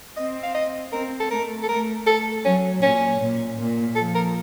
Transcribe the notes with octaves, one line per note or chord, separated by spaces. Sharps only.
C4 D#5
F5
D#5
C4 A#4
A4
A3 A#4
A4
A3 A#4
A4
F#3 C#4
A#2 C#4
A#2
A#2
F3 A4
A#4